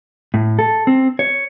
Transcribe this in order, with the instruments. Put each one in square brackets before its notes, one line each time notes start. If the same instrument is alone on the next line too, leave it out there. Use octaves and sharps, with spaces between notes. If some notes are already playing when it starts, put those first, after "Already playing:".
[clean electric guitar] A2
A4
C4
C#5